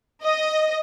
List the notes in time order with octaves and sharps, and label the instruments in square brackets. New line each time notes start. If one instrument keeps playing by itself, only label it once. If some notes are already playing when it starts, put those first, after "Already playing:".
[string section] D#5